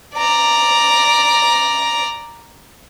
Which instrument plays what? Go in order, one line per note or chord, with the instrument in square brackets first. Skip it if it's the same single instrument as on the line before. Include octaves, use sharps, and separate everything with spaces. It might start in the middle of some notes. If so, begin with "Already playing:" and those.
[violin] D5 A#5